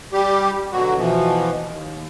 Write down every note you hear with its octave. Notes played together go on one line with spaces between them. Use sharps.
G3 G4
B2 D3 F#3 F#4
B2 E3 F3
D#2